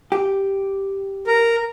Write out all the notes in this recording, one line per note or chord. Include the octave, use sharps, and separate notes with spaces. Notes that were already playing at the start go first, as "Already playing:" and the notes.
G4
A#4